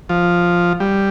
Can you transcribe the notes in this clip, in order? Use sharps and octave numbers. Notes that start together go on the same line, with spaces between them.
F3
G3